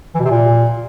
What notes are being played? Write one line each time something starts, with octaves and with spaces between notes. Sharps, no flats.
E3
B2
C3
A#2